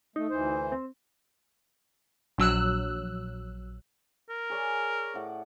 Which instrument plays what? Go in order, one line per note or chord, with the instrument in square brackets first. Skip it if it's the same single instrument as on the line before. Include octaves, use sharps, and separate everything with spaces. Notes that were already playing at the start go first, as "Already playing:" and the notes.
[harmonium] A3 [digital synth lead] D#4
[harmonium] D2 E3 C5
[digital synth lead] C4
[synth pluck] A#1 F#3 E6 F#6
[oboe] A#4
[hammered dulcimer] G#4 C#5 D5
A2 F#5 D6